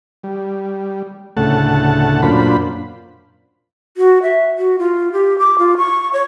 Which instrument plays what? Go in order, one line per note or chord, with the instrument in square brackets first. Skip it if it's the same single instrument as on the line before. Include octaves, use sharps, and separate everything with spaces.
[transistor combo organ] G3
D2 A2 C#3 A3 F#5 A5
F#2 A#2 D4 F4 C5 B5
[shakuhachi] F#4
E5
F#4
F4
G4
D6
F4
C#6
C#5